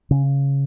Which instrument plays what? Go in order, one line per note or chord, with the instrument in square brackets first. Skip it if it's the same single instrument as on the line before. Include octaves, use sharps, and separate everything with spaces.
[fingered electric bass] C#3 C#4